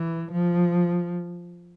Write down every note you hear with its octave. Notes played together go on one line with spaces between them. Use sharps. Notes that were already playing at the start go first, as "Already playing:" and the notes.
Already playing: E3
F3